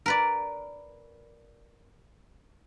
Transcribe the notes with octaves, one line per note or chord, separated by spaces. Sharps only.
A#4 B4 D5